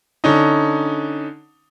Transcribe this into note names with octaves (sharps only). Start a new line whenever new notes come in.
D3 C#4 D#4